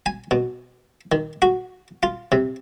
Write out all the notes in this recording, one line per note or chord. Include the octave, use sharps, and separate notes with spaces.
G#5
B2
D#3
F#4
F4
C3